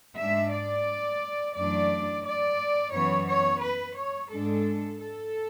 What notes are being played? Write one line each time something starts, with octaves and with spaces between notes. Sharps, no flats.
G#2 G#3 D4 E5
D5
F#2 E3 A3 D4 D5
D5
F#2 E3 B3 C#5
C#5
B4
C#5
G#2 G#3 D4 A4
A4